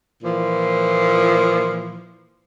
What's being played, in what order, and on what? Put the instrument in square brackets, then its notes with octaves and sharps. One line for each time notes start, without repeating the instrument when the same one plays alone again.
[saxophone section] A#2 E3 F3